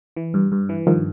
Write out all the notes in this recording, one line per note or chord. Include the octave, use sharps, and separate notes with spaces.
E3
G2
G2
E3
G2 D#3 F3